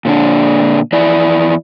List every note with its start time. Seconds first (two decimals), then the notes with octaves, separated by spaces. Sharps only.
0.05 A#2 D3 D4
0.92 E2 E4 D5